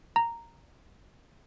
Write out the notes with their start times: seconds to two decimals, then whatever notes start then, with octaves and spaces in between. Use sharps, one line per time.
0.16 A#5